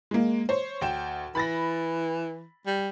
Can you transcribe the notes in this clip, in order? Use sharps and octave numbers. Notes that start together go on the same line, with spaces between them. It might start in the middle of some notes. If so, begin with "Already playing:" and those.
G#3 A#3
C5 C#5
D2 G5 E7
E3 B5 A6 A#6
G3